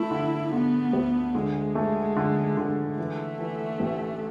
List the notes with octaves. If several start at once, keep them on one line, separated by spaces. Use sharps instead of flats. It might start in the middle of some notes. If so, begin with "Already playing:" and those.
Already playing: A3 E4
D3
D3 B3
D2
D3 G#3
A3
D3
D3
E3 A3
E3
A1